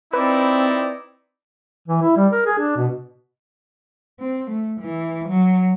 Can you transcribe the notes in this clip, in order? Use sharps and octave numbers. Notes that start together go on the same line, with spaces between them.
C4 D#4 E4 B4 D5
E3
E4
G3
A#4
G#4
D4
B2
C4
A3
E3
F#3